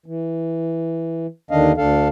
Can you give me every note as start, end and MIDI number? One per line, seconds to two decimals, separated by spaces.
0.06 1.27 52
1.51 1.72 39
1.51 1.72 50
1.51 1.72 51
1.51 1.72 62
1.51 1.72 75
1.51 1.72 77
1.77 2.08 38
1.77 2.08 62
1.77 2.08 69
1.77 2.08 77